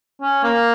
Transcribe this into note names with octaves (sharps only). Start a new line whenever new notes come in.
C#4
A#3